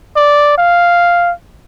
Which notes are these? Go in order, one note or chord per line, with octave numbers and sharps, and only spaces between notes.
D5
F5